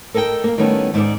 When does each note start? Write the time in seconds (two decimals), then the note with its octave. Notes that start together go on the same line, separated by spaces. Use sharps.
0.14 A4 A#4 D#5 F#5 G5
0.44 A#3 F5
0.58 D#3 G3 A3 B3 C#4 E4
0.94 G#2 D5